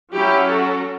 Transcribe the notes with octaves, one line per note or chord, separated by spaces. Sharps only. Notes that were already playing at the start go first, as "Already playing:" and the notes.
F#3 C#4 E4 G4
F#4 A4